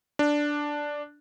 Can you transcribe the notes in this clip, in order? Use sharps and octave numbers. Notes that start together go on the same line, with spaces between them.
D4